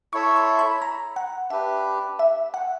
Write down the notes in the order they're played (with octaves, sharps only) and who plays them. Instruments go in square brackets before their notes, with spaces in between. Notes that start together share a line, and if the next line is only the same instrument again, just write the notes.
[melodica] E4 A4 C#5 E5 [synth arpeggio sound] C#6
[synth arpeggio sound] C6
B5
A#5
F#5
[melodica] D4 G4 B4 [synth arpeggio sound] E5
[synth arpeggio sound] E5
F#5